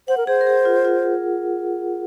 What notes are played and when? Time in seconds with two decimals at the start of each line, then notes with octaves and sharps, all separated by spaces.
0.08 C5 F#5
0.17 A#4
0.27 G#4 C5
0.41 A#4
0.47 G#4
0.65 F4
0.85 F4